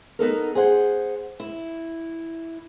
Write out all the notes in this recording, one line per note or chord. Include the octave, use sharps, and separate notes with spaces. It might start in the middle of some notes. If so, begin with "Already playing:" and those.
B3 D#4 A4 A#4
G#4 C5 F#5
E4